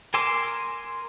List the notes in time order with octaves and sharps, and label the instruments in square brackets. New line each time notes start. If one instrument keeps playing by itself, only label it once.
[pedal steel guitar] A#4 G#5 C6 D6 E6